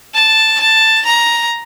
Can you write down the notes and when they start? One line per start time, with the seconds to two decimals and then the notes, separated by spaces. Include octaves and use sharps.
0.15 A5
0.60 A5
1.06 A#5